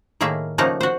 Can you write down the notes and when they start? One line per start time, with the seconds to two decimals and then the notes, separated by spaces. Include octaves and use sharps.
0.21 A2 D#3 A#3 G#4 E5 F5
0.58 C#3 F3 A3 A#3 D#4 F#5
0.81 F#4 C5